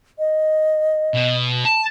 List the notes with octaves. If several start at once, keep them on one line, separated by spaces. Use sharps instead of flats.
D#5
B2
A5